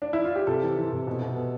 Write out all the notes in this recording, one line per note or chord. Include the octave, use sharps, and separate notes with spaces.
D4
E4
F4
G4
C3 A4
E3
E3
C3
B2
B2
B2